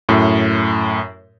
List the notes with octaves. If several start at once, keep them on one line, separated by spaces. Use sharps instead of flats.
F#2 A2